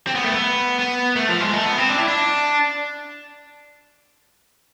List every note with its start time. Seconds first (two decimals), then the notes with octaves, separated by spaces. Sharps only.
0.07 C4
0.15 B3
0.24 A3
0.32 B3
0.79 B3
1.16 A3
1.29 F3
1.41 G#3
1.53 A3
1.65 B3
1.78 C4
1.89 D4
1.98 E4
2.08 D4